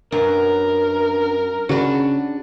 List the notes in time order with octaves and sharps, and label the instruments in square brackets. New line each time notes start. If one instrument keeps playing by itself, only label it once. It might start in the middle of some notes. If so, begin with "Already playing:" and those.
[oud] F#2 [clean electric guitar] D4 B4 F5 [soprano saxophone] A#4
[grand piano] C#3 B5 [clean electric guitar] C#4 [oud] D4 F#4